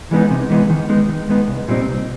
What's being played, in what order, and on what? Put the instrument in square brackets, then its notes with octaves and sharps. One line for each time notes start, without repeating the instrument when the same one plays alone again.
[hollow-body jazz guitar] E3 G#3 B3 D#4
C3
E3 G#3 B3 D#4
D#3
G#3 B3 D#4
D#3
G#3 B3 D#4
C2
A#2 G3 C4 D#4
C2